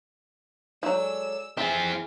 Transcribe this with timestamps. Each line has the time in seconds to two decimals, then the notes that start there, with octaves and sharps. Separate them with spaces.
0.83 F3 F#3 G#3 A4 D5 E6
1.57 E3 C4 F4 G#4 E5 G#5